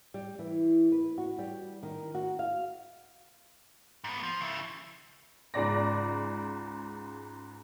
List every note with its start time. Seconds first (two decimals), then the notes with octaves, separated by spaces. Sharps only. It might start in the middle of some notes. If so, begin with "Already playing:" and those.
0.14 G3
0.39 E3
0.92 B4
1.18 F#4
1.39 G3
1.83 D#3
2.15 F#4
2.39 F5
4.04 G#2 B3
4.23 F3
4.41 C#3 E4
5.54 C#2 G#2 D5 A#6